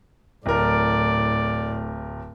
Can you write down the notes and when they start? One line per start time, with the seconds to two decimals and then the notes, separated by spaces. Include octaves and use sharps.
0.46 D1 A2 A#4 D5